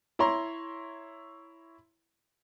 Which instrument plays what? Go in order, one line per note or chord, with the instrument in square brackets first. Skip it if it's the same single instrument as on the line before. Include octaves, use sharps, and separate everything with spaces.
[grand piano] E4 C#5 A#5 C6